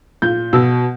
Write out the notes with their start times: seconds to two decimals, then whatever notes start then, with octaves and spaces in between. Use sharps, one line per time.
0.22 A#2 G6
0.53 B2 E6